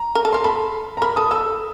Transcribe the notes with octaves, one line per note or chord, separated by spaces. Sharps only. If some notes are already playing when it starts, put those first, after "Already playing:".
Already playing: A#5
A#4
A4
A#4 C6
A4 B5
A#5
A#4 B5
A4 D#6
A4 E6